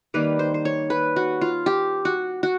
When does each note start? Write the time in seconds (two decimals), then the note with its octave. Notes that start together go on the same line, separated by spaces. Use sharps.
0.14 D#3 G3 A#3 B4
0.39 C5
0.54 C5
0.65 C#5
0.90 B4
1.16 F#4
1.41 F4
1.66 G4
2.05 F#4
2.43 F#4